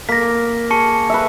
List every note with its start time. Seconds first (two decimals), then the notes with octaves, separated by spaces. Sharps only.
0.09 A#3 A#6 B6
0.71 G#4 A5 C#6 C#7
1.10 B4 E5